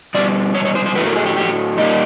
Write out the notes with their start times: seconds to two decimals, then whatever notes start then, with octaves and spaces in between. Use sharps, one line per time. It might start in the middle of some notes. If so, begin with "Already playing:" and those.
0.14 B2 G3 D5
0.54 C#5
0.65 C#5
0.75 C5
0.86 C5
0.95 A2 F#3 A3 B4
1.06 A#4
1.16 G#4
1.26 G4
1.37 G4
1.77 A#2 G3 A#3 D#4